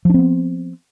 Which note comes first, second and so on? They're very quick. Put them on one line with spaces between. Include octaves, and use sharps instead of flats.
F3 D4 C4 B3